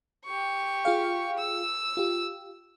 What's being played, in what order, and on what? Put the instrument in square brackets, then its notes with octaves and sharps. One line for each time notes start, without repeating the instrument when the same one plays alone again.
[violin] G4 C#6
[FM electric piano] F4 G#4 F5
[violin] E6
[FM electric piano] F4 G4